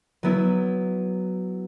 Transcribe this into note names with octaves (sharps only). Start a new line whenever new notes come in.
F#3 B3 E4